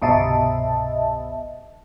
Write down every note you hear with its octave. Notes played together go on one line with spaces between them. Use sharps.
G1 C2 B2 D#5 E5 A5